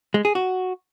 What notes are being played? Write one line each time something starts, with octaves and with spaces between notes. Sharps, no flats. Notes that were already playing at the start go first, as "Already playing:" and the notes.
G#3
G#4
F#4